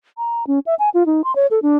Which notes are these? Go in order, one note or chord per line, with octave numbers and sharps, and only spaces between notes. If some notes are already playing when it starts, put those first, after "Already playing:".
A#5
C#4
E5
G#5
F4
D#4
C6
C#5
A4
D4